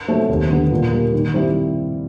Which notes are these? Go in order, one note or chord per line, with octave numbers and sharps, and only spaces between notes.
F#3 A3 C4
D#2
D3 G3 B3
A#2
G3 A#3
D#3
G3 C4 E4